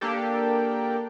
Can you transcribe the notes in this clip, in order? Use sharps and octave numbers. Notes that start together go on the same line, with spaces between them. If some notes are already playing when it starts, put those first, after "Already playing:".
A#3 D4 G4 A4